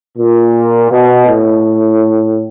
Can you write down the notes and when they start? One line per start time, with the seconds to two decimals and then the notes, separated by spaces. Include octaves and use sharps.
0.18 A#2
0.91 B2
1.27 A2